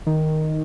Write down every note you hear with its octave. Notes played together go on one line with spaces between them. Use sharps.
D#3